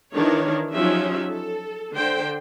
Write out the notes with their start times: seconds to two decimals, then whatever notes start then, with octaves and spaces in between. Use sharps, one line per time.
0.15 D#3 E3 D4 A#4 C#5
0.73 F3 F#3 C#4 D#4 G4 E5
1.33 A4
1.95 D3 C5 G5